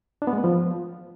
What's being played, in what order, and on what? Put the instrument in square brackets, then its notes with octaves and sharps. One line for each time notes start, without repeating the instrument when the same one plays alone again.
[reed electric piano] D4
B3
G#3
B3
F3